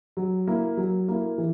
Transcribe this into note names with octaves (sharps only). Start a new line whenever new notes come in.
F#3
A#3 E4
F#3
A#3 E4
E3